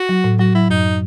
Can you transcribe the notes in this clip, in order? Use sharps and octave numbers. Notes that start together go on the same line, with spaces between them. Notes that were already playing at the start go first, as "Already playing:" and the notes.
Already playing: F#4
F#3
A2
F#3 F#4
F#3 E4
F#2 D#4